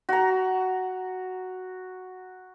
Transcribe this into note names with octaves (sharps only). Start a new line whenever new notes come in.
F#4 A#5